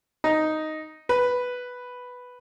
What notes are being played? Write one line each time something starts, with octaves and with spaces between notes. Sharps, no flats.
D#4
B4